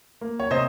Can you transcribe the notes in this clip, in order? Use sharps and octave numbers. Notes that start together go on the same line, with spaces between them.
A#3
C#5
C3 C5 D#5